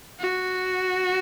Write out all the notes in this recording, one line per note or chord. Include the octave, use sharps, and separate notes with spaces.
F#4